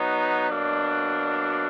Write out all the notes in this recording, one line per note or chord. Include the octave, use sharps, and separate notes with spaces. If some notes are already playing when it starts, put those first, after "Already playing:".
Already playing: F#3 B3 D#4
B2 F#3 A#3 D4